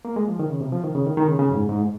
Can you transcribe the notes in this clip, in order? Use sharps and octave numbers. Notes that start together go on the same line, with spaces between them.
A#3
G#3
F3
D#3
C#3
C3
F3
D#3
C#3
D#3
D#3
C#3
C#3
F#2
G#2
G#2